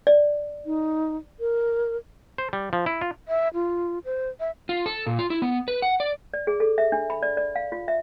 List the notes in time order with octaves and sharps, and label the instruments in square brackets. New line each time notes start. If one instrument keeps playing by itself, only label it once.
[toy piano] D5
[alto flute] D#4
A#4
[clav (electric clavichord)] C5
G3
F3
E4
F4
[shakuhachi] E5
F4
C5
E5
[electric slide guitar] F4
A4
A#2
F4
E4
B3
B4
F#5
D5
[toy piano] D5
G#4
A4
E5
D4
B5
D5
D5
F5
F4
E5